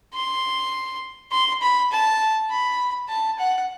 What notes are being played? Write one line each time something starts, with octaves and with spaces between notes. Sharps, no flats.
C6
C6
B5
A5
B5
A5
F#5